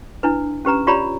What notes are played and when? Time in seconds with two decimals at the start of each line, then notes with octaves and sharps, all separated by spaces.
0.23 D4 E4 B4
0.65 C#4 G4 B4 A#5
0.87 F4 G4 C#5 D5 A#5 B5